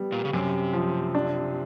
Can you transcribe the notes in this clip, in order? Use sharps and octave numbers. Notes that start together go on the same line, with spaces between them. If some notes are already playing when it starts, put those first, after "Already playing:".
Already playing: G3 B3
A#2
C#3
F#2 C3
F3
D4